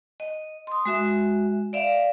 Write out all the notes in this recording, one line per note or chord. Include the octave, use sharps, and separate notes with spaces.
D#5
C6 D#6
G#3 F#4 E5
D5 E5 F5